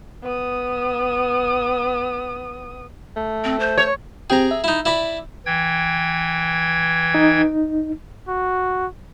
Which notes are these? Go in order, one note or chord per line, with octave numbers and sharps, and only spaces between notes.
B3 D#6
A3
C4
C5
C#5
C4 G4 G#4 G5 A#5
E5
D#4 E4
E4 D5 B5
E3 G5 G#6
D#4
F#4